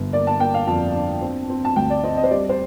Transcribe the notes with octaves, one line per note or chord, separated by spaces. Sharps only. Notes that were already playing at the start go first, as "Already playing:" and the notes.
Already playing: G1
A#3 D5
A5
A#3 G5
F5
F2 A5
D4
C4
C4
A5
D2 G5
D5
C4 D#5
D#5
C5
G3 D5
C5